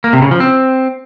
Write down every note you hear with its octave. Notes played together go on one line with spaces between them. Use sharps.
A#3
C3
C#3
F3
C4